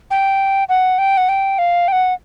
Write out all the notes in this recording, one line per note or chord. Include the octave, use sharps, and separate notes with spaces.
G5
F#5
G5
F#5
G5
F5
G5
F#5